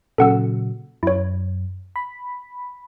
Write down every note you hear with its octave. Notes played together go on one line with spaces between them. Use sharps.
A#2 C#3 F#3 A4 F#5 E6
F#2 E4 C#5
B5